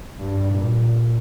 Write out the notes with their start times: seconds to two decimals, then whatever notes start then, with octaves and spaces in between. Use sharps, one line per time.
0.19 G2
0.53 A#2